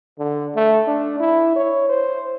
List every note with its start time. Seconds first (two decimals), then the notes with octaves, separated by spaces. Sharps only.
0.19 D3
0.56 A3
0.87 D4
1.20 E4
1.56 C#5
1.89 C5